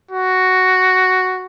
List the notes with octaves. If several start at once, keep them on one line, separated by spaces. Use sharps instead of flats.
F#4